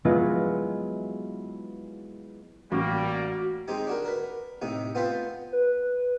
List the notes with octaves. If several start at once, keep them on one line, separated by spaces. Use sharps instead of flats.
F#3 G#3 B3 E4 F4
A1 G3 A#3 F#4
G#3 C4 D#4 G4
D4 F#4 A#4
A#4 B4
A2 C3 D#4
B3 C4 F4 A4 B4 C5
B4